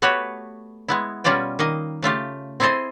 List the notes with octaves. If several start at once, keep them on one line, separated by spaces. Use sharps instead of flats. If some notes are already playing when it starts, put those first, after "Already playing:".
A3 B3 F#4 G4 B4 C#5
G#3 B3 E4
B2 G3 C#4 F4 D5 G5
D#3 A#3 D#5
C#3 A3 F4 G4
C4 E4 G#4 A4 C5 D#5